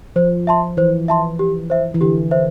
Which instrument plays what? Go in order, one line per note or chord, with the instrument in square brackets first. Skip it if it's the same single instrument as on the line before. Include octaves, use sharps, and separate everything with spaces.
[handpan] F3 [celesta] C5
[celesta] E5 A5 C6
[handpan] E3 [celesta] C5
[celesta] E5 A5 C6
G4
C5 E5
[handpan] E3
[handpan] D3 [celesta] G4
[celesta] C5 E5